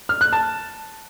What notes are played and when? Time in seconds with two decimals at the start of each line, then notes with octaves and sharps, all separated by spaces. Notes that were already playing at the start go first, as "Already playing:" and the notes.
0.09 F6
0.21 F#6
0.33 A5